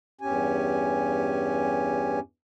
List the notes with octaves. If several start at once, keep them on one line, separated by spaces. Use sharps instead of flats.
E2 G2 C#4 G4 G#5